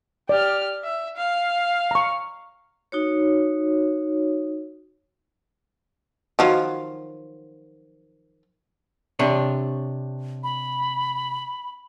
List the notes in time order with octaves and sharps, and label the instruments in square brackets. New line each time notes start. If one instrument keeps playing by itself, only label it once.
[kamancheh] G4 F6 [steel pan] D5
[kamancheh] E5
F5
[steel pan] A#5 C#6
[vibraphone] D#4 F#4 C#5
[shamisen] D#3 F3 F#3
[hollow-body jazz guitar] C3 D4 C#5
[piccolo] B5